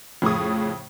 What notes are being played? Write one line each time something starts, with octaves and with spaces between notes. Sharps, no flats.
F2 A2 C#3 C#6 D#6